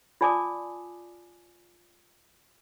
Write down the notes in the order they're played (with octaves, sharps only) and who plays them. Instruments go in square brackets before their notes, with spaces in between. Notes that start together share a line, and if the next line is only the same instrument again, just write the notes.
[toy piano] F4 D5 G#5 A5 D6 D#6